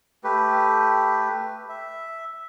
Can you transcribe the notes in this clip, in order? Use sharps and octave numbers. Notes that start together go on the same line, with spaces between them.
A3 G4 B4
E5